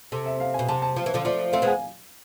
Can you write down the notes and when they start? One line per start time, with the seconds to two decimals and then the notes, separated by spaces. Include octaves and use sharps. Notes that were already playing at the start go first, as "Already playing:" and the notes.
0.12 C3 A4
0.26 E5
0.40 F5
0.54 B2 G#5
0.69 C3 A5
0.82 A5
0.96 F3
1.06 E3
1.14 D3 F3
1.25 F3 A3 D5
1.53 A3 C4 F5
1.62 G#3 B3
1.67 G#5